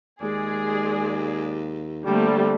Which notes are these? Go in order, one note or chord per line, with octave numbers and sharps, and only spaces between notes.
D#2 G#3 G#4 D5
D3 G3 A3 A#3 C4